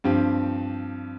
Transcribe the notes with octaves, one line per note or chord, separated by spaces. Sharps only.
G2 F3 C4 G4